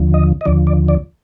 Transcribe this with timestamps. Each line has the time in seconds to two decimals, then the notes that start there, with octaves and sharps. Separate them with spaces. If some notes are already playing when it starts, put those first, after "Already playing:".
Already playing: D#2 D3 F3
0.14 D#5
0.41 D#5
0.45 D#2 D3 F3 D5
0.67 D5
0.88 D5